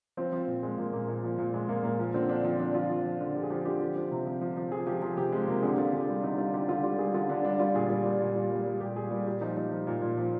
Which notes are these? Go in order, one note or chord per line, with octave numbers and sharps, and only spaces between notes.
F3 C4
F3
A#2
A#2 G#3
A#2 A#3
A#2 A#3
A#2
F3
A#2
A#2 G#3
A#2 A#3
A#2 A#3
F3
D3 C4
F3 D4
F3 C4
F3 D4
F3 F4
F3
F3
D3
F3 G4
G#4
F3 G4
D3 G4
F3
F3
C3
F3
F3
F3
F3 G#4
F3 G4
F3 G#4
C3 G4
F3 G#3
C3 A#3
D3 G#4
G4
D3 F4
D3 G#4
G3 G4
D3 D#4
G3 F4
D3 G4
D3 F4
G3 F4
G3 G#4
D3 F4
D3 D4
G3 D4
G3 F4
A#2 G#4
G3
G3
A#2
G3
G3
G3
A#2 G4
G3 G#4
G3
A#2 G4
F3 D#4
F3 D#4
F3
A#2
A#2
F3